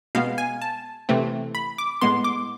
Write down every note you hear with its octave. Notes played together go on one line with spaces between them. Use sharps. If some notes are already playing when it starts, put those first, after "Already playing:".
B2 G#3 B3 F5
G#5
A5
C3 E3 A3 C4
B5
D6
A2 G#3 B3 C6
D6